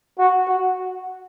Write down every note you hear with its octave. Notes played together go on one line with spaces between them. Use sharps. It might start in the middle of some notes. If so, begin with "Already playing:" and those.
F#4
F#4